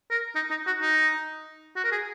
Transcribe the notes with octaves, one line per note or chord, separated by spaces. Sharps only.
A#4
D#4
D#4
F#4
D#4
F#4
A#4
G#4